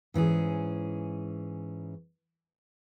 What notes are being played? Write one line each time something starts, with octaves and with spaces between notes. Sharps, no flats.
G#2 E3 C#4 G#4